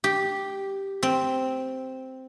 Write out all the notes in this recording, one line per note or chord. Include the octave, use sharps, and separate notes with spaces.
G4
C4